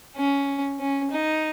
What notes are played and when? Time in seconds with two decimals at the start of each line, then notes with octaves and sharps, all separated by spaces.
0.17 C#4
0.80 C#4
1.11 D#4